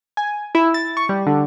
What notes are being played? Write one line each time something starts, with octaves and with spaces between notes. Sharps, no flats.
G#5
E4
A6
C#6
G3
D3